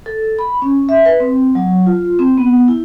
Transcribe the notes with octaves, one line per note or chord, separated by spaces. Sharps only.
A4
B5
C#4
E5
B4
C4
F#3
F4
C4
B3
E4